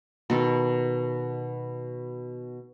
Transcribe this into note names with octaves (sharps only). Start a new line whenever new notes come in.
B2 D#3 A4